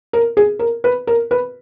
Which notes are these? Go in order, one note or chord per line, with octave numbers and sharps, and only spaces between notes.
A#4
G#4
A#4
B4
A#4
B4